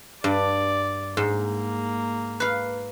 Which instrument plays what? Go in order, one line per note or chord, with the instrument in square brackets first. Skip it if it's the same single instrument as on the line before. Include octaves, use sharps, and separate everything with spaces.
[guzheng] G2 [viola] D5
[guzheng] G#2 [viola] A#3
[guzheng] B4 F5